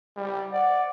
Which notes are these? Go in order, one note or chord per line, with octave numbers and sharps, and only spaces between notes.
G3
D5 F#5